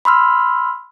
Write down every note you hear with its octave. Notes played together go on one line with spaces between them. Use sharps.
B5 C6 E6 F6